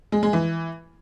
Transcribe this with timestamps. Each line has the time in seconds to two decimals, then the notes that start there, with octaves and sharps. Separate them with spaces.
0.12 G#3
0.23 G#3
0.33 E3